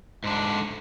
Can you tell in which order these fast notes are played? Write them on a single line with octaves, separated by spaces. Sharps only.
G#2 D4 D3